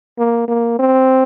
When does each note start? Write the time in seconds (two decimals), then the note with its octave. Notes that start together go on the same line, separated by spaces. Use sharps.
0.18 A#3
0.48 A#3
0.79 C4